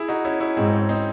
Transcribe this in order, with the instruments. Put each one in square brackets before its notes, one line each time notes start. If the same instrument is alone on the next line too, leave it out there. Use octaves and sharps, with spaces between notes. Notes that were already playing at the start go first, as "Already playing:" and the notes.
Already playing: [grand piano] E4 G#4
D#4 F#4
C#4 E4
C#4 E4
[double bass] G#2 [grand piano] C4 D#4
[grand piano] C#4
C4 D#4